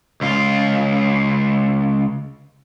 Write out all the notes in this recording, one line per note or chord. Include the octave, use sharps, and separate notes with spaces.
C#2 F4